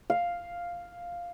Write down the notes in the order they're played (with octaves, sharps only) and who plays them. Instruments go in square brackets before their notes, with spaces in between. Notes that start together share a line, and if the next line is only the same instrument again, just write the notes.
[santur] F5